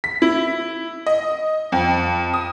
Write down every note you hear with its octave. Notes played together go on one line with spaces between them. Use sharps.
B6
E4
D#5
F2
D#6